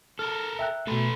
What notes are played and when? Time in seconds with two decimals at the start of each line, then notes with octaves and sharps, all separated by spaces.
0.19 A4 A#4 F6
0.59 E5 G5 F#6
0.87 B2 A3 A4 B4